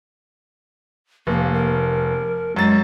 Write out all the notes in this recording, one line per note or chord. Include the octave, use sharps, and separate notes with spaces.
F1 A#3
A#4
F#2 G#3 A6